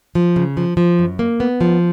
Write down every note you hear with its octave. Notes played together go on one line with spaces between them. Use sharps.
F3
C#3
F3
F3
F#2
A#3
B3
F3